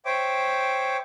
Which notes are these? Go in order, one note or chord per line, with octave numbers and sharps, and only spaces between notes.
C5 C#5 E5 G5 D6